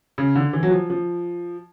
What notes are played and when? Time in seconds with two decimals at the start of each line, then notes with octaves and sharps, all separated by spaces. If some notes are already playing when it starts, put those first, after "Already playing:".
0.18 C#3
0.36 D3
0.53 E3
0.63 F#3
0.71 F3
0.90 F3